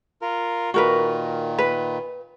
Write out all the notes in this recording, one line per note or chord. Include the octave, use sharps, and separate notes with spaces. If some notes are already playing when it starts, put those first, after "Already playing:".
F4 A#4
A#2 D#3 F#4 A#4 B4
B4